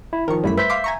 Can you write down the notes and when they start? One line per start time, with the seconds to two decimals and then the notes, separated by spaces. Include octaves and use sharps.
0.13 E4
0.28 D#3 F3 A#4 C#6
0.44 F#2 G3 A3 E4 B5
0.58 B4 C5 E5 G6 B6
0.70 F5 C6 D6
0.84 G#5 A#5 C#6